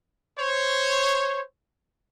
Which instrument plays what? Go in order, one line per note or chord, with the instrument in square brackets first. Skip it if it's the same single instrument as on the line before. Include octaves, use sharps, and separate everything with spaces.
[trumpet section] C5 C#5